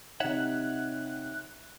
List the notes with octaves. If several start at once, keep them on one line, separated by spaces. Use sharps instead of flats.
C3 D#4 C#5 E5 F#5 F#6